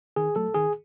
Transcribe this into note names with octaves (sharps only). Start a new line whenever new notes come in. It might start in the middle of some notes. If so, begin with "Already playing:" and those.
D#3 G#4
F#3 A3 A4
D#3 G#4